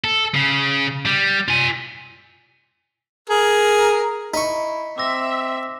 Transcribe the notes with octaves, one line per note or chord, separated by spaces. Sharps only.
A4
C#3
G3
F4 G#5
G#4 A#4
D#4 E4 C#6 B6
C4 E5 D6 E6 A#6